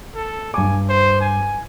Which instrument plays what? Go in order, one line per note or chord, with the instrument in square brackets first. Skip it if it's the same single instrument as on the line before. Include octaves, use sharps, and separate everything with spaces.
[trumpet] A4
[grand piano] G2 D6 [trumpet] G#5
[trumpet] C5
G#5